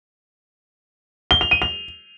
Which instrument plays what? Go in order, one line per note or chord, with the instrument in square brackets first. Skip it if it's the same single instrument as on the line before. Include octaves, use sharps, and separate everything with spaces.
[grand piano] G7
F7
D#7
F7